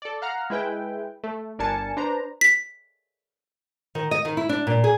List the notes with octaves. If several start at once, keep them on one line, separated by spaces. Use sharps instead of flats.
A4 D5
F5 F#5 A#5 F6
G#3 E4 B4 G5
A3
G1 D4 A#4 G#5 A5 C#7
D4 B4 C5 A#5
B6
D#3
D#5
D#3
E4
D4
A#2
G#4